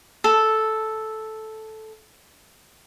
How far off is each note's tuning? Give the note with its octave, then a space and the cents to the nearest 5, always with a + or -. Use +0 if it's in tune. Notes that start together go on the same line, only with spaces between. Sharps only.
A4 -5